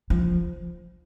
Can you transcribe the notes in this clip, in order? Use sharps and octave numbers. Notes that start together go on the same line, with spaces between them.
F3